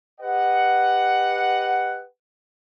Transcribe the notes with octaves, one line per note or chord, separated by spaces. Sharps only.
G4 B4 D#5 F#5